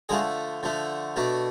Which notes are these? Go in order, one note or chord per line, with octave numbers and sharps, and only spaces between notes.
D3 F3 G#3 A3 G#4
D3 F3 A3
B2 A3 D4